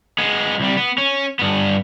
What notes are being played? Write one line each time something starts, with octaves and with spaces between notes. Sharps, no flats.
G#3 B3
C2 G3
B3
C#4
G2 B3